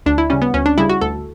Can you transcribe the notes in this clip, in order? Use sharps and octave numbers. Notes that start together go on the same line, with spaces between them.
D2 D4
E4
C#3 G3 C#4
B3
D2 C#4
D4
C#3 G3 E4
F#4
D2 A4